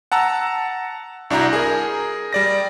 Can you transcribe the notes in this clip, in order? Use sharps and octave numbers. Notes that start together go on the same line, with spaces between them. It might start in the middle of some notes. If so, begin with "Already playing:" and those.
F#5 A5 A#5 E6
C2 D4 E4 F#4 A#5 G6
G#4 A#4
G3 D5 A#6